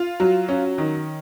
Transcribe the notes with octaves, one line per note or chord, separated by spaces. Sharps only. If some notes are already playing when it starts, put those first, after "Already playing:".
Already playing: F4
F#3
C#4
D#3